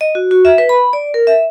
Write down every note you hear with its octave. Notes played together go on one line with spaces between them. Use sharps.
D#5
F#4
F#4
E5
B4
B5
D5
A#4
E5